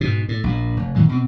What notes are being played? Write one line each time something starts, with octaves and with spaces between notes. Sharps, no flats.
G#2 B2
A2
A#1 A#2
F1
A#2 D#3 E3 G#3
B2 C4